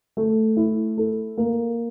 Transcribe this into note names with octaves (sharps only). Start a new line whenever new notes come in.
A3
E4
A4
A#3